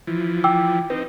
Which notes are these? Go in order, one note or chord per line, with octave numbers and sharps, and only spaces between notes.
E3 F3
G5 D6 E6
C4 D#4 B4